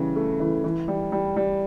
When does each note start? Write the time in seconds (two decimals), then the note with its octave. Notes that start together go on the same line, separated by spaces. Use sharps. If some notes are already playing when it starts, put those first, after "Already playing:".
Already playing: C#3 E3 G3
0.16 A3
0.40 E3
0.64 E3
0.88 G3
1.12 G3
1.36 G3